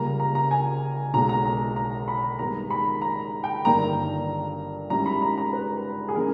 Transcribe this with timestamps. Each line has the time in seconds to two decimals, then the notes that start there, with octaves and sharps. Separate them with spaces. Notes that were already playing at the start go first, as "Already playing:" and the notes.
Already playing: C#2 C#3 G3 A#3 A#5
0.20 A#5
0.35 A#5
0.51 G#5
1.13 B1 B2 G#3 D#4 A#5
1.29 A#5
1.45 A#5
1.76 A#5
2.08 B5
2.39 G#2 D#3 G3 B3 A#5
2.70 B5
3.02 A#5
3.44 G5
3.65 G1 G2 D#3 A#3 A#5
4.90 G#2 G3 C#4 E4 A#5
5.06 B5
5.22 A#5
5.38 A#5
5.53 B4
6.08 G#4
6.16 E3 G#3 C#4 A#4